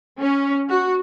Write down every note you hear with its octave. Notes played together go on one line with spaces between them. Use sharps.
C#4
F#4